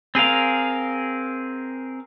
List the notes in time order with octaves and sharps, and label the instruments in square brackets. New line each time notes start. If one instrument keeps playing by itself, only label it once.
[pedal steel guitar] C4 G#4 A#4 F5